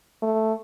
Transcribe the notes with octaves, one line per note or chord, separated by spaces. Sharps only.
A3